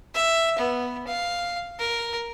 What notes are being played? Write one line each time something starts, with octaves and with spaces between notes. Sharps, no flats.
E5
B3
F5
A#4